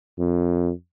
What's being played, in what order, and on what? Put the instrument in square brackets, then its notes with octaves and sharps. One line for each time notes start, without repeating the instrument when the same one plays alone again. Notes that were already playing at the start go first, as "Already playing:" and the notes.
[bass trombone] F2